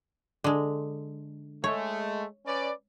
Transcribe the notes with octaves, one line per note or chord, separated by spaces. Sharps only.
D3 G#3
G#3 A3 C#5
C#4 B4 D5